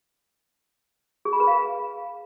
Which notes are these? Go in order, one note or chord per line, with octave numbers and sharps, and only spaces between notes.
G#4
B5
B4
F5